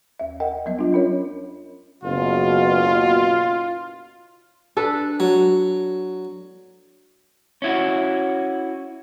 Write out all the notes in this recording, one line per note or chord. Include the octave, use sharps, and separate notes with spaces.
D#2 E5
A#4 D#5 F#5 G5
F#3 G3 B3 D#5
D4 F4
F#3 C#4 A#4 C#5
F#1 B2 F4
D4 A4 B4
F#3
C#4 E4 F#4